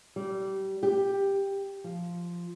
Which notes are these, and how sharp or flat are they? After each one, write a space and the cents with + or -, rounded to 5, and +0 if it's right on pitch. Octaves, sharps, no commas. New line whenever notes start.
G3 -25
G4 +10
F3 -5